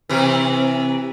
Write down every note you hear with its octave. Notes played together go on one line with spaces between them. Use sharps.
C3 E3